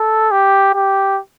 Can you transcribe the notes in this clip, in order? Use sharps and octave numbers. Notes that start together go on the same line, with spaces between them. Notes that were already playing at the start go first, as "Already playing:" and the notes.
Already playing: A4
G4
G4